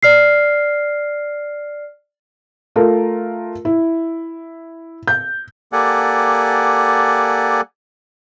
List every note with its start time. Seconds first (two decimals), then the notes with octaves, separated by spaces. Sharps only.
0.03 D5 F6 C7
2.76 A3 F4 A#4
3.65 E4
5.08 G6
5.73 A#3 G4 A4 D5 F#5 G#5